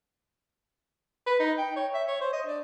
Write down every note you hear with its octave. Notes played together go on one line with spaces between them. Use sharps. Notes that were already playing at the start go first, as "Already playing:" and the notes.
B4
D#4
G5
C#5
E5
C#5
C5
D#5
D4